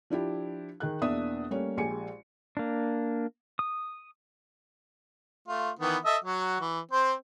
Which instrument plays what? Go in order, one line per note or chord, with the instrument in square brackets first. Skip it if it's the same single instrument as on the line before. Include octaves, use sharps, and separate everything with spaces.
[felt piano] F3 D4 E4 G4
D#3 D#4 G#4 F#6
E2 B2 A#3 D4 E5 D#6
G3 A3 A#3 C#4 C#5
A#1 G#3 G4 G#5 C#7
[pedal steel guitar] A#3 D4
D#6
[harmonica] A3 F4
D#3 E3 B3
A4 D#5 E5
F#3 F#4
E3
C4 C5